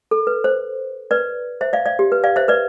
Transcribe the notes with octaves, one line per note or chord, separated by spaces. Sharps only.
A4
B4
C5
B4 D5
C5 E5
D5 F5
D5 F5
G4
B4
D5 F5
C5 E5
B4 D5